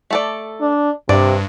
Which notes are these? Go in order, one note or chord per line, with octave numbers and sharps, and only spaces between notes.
A3 A4 D5
D4
G2 C3 D5